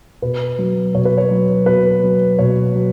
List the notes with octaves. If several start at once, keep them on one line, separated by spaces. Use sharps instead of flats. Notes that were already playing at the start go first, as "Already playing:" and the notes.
B2 B4
F#3
B2 C#5
B4
C#5
F#3
B2 B4
F#3
B2 C#5
F#3